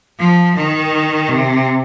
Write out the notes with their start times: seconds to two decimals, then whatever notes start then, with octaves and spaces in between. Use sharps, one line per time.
0.19 F3
0.56 D#3
1.29 C3